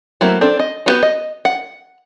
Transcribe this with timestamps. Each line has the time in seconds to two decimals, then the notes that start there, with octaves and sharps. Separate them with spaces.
0.21 F#3 A3 A#3 C4 E4
0.41 C4 D4 A4
0.59 D#5
0.86 G3 B3 F#4 G4 B4
1.03 D#5
1.45 F#5